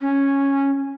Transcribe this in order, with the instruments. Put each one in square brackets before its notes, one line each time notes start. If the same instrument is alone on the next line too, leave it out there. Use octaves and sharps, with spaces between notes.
[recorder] C#4